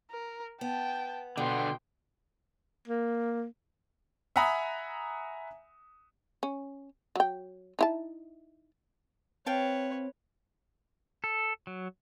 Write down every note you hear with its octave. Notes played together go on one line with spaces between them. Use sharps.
A#4
B3 G5 A5
B2 D3 B3 G5 C6
A#3
E5 F#5 G#5 A#5 B5 D#6
C#4
F#3 G5
D#4 E4 A5
C4 B4 C#5 F5 G5 A5
A4
F#3